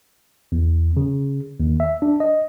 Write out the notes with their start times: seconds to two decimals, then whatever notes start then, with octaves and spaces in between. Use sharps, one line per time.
0.52 E2
0.97 C#3
1.60 D#2
1.80 E5
2.02 D4
2.20 D#5